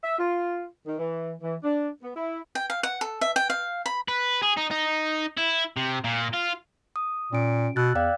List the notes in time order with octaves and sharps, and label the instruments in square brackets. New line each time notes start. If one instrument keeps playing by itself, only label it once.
[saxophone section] E5
F4
D#3
E3
E3
D4
B3
E4
[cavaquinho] G5
F5
F#5
A4
E5
G5
F5
B5
[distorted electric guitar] B4
G#4
D#4
D#4
E4
C3
A#2
F4
[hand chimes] D#6
[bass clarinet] A#2 [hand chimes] C#4 D7
[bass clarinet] B2 [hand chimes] E6 F#6 A6
[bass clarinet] E2 [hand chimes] D5 F5 G5